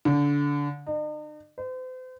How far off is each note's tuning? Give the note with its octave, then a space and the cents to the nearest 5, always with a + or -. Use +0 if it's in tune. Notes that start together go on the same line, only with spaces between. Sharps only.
D3 -25
D#4 -45
C5 -40